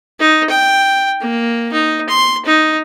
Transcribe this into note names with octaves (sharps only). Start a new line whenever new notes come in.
D#4
G5
A#3
D#4
C6
D#4